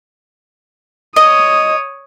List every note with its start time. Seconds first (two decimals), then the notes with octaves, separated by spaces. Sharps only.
1.16 C#5 D#5 D#6